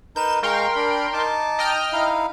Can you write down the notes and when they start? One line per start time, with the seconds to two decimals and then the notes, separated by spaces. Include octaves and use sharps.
0.16 D#4 A#4 B4 G6 E7
0.43 G#3 A#4 F5 G5 C6 C#6
0.76 D4 B5
1.13 D#4 A5 D6
1.59 D#5 G5 F6
1.93 D#4 E4 F5